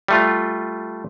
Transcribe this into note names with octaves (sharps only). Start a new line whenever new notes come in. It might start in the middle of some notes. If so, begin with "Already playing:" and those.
G3 A3 F4